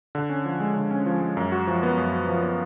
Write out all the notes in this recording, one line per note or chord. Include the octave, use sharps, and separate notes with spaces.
D3
C#4
F3
G#3
D3
C#4
F3
G#3
F#2
F#4
F3
B3
F#2
F#4
F3
B3